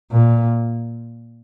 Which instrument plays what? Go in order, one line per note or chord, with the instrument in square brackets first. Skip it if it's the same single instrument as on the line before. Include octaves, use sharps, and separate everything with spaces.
[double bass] A#2